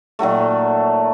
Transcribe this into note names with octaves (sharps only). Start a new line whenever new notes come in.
A#2 D#3 F#3 A3